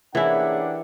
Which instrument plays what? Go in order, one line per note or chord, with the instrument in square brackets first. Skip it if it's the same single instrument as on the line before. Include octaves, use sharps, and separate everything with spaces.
[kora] E3 E4 [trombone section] A#3 C#4 G#4 [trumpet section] D4 G4 F#5